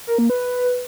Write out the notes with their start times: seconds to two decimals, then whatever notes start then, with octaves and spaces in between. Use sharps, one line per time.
0.07 A#4
0.18 A#3
0.30 B4